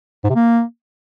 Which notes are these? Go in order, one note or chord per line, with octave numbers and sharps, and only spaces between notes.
G#2
C3
A#3